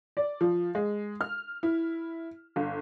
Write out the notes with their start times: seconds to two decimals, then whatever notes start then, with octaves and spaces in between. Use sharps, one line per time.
0.17 D5
0.41 F3
0.75 G#3
1.21 F6
1.63 E4
2.56 G1